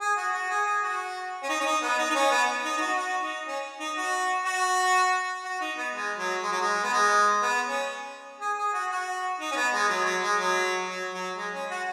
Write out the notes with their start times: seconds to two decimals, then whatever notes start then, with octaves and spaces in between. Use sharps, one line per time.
0.01 G#4
0.17 F#4
0.34 F#4
0.50 G#4
0.66 G#4
0.83 F#4
1.43 C#4
1.49 D#4
1.60 C#4
1.66 D#4
1.82 B3
1.98 D#4
2.10 D#4
2.15 C#4
2.31 B3
2.64 D#4
2.77 D#4
2.81 F#4
2.98 F#4
3.22 D#4
3.47 C#4
3.80 D#4
3.96 F#4
4.46 F#4
5.44 F#4
5.61 D#4
5.77 B3
5.94 G#3
6.18 F#3
6.43 G#3
6.52 F#3
6.61 G#3
6.84 B3
6.93 G#3
7.42 B3
7.66 C#4
8.40 G#4
8.57 G#4
8.74 F#4
8.91 F#4
9.40 D#4
9.51 C#4
9.56 B3
9.73 G#3
9.89 F#3
10.05 F#3
10.23 G#3
10.39 F#3
10.88 F#3
11.13 F#3
11.37 G#3
11.54 C#4
11.71 F#4